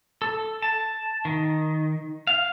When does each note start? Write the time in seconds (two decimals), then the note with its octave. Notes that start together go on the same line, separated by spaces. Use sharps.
0.22 A4
0.62 A5
1.25 D#3
2.27 F5